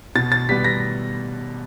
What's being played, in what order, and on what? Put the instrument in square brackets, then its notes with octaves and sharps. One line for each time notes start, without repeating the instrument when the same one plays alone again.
[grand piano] B2 A6
A6
G3 B3 B6
A#6